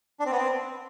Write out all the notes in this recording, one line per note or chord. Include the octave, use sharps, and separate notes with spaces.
D4
C4
B3
C4